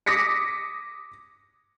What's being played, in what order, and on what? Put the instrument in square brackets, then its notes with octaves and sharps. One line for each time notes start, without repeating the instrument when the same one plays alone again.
[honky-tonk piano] D6 D#6 A#6 B6 C#7